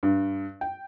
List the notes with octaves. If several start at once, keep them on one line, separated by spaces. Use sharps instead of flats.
G2
G5